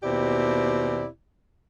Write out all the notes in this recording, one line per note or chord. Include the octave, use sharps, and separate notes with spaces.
D#2 B2 C4 E4 G4 D5